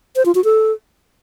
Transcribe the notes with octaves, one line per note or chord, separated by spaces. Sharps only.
C5
F4
F#4
A4